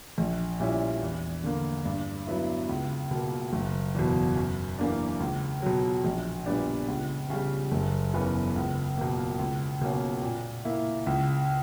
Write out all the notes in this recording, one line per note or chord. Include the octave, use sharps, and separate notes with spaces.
A#1
A#2 G3 C#4 E4
E2
D3 A#3
G2
F#3 B3 E4
C#2
B2 A#3
F#1
E2 B2
F#2
E3 A#3 D4
C#2
B2 F#3
A#1
A#2 G3 B3 D4
C#2
C#3 G3
F#1
E2 C#3 E3 B3
C#2
B2 A#3
C#2
B2 A#3 C#4
A#2
A#3 E4
C#2